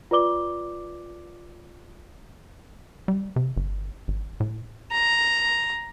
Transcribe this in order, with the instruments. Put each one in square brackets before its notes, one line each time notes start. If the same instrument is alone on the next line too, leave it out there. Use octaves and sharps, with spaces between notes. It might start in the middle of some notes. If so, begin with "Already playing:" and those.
[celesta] F4 B4 D5 D6 G7
[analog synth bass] G3
C3
G1
G#1
A2
[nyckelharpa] A#5